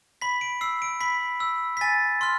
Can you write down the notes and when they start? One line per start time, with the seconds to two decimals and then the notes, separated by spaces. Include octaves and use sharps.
0.22 B5 B6
0.41 D7
0.61 E6 C7
0.82 D7
1.01 B5 B6
1.40 E6
1.77 B6
1.81 G#5 A6
2.21 C6 F6